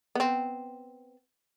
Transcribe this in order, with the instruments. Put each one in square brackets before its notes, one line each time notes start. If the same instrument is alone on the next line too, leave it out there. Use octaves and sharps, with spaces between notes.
[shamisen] B3 C4